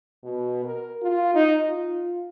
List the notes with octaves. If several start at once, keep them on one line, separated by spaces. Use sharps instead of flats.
B2
A#4
F4
D#4
F4